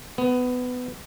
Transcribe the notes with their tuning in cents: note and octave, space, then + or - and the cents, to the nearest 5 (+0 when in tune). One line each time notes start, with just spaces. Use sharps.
B3 +15